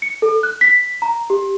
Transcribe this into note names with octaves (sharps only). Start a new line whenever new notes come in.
C#7
A4
F#6
B6
A#5
G4